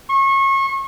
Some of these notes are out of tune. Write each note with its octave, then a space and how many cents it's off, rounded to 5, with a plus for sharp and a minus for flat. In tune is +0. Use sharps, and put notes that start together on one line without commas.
C#6 -30